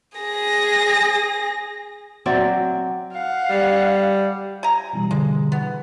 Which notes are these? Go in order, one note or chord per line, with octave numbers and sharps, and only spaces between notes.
G#4 A#6
F#3 C4 D5 E5
F5 F#5
G3
G#5 A#5
B2 E3 G3
D3 G#3
B3